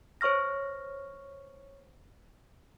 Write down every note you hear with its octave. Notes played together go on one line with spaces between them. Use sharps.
C5 C#5 C#6 F6 A#6